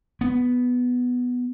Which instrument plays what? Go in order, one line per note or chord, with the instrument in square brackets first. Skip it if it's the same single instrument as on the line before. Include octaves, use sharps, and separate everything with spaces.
[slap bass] B3